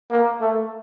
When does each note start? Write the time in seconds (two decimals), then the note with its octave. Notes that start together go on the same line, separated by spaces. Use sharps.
0.10 A#3
0.41 A3